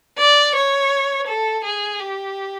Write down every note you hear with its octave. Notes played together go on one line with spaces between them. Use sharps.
D5
C#5
A4
G#4
G4